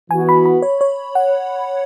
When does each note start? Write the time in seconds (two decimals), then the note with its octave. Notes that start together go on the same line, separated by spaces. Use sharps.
0.10 E3 B3 F#4 G#5
0.29 B5
0.46 B5
0.62 C#5
0.81 C#5
1.15 F#5